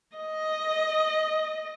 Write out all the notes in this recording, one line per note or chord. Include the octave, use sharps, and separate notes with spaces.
D#5